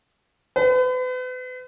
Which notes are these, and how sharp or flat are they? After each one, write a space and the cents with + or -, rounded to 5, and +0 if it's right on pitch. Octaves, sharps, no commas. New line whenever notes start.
B4 +40